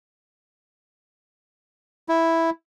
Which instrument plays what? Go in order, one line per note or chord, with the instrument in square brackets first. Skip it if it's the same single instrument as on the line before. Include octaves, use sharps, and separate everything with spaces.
[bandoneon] E4